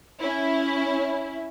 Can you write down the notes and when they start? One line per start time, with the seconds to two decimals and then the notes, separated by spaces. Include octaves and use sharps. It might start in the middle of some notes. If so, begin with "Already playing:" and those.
0.21 C#4 E4